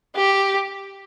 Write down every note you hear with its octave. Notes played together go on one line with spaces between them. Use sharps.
G4